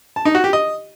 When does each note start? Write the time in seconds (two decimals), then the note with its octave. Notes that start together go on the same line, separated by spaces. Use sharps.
0.16 A5
0.25 D#4
0.35 F#4
0.44 G4
0.53 D#5